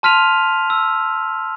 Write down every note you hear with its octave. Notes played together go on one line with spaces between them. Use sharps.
A5 C6 F6 B6 D#7 F7
E6